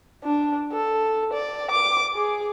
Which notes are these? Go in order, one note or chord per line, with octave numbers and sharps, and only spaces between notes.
D4
A4
D5
D6
G#4